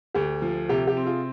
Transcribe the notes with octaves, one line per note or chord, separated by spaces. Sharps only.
D2 G4
F3
C3 G4
G4
C4
F4 G#4